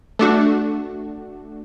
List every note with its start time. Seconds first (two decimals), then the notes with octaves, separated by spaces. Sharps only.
0.19 A3 D4 F#4